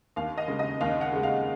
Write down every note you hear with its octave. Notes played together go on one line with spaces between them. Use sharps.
D#2 F5
D#5
C#3 G#3
D#5
D#2 F5
F#5
C#3 G#3
F5